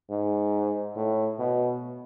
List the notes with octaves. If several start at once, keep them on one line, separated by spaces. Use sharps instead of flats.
G#2
A2
B2